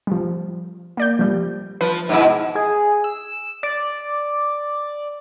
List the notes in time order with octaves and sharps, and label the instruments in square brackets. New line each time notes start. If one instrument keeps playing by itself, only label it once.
[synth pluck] F3 G3
A#3 D5 G6
F3 G3
[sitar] F3 [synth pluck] B4
[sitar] G#2 B2 E4
[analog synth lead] G#4
E6
D5